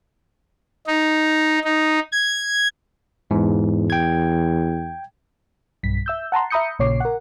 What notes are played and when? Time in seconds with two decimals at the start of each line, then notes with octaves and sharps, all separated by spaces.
0.87 D#4
1.64 D#4
2.12 G#6
3.31 E2 G#2
3.90 G5 G#6
5.83 B1 G2 B6
6.06 E5 E6 G6
6.32 F#5 A5 A#5 C6
6.50 E5 A#5 B5 D#6 G6 C#7
6.79 A#1 A#2 C#3 C#5 D6 C7
7.00 A#4 F#5